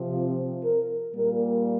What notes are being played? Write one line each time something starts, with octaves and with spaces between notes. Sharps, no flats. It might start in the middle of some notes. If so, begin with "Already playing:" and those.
Already playing: C3 F3 C4
F4
A#4
A#2 G3 A#3 A#4